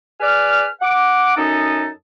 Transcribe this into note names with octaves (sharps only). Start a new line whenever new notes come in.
G#4 B4 D5 F6
F#5 D6
F#2 C#4 D#4 A4 D#5 D#6